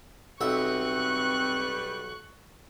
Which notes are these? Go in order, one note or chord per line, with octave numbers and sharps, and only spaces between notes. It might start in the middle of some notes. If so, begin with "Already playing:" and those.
B1 G3 C4 B4 E5 C#6 F#6